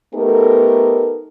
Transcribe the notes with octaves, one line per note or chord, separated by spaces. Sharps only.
A3 B3 D#4 G4 A4 A#4